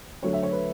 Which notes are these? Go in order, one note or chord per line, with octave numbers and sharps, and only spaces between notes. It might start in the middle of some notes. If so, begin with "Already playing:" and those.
D3 F#3 A3 C#5
E5
C#5
B4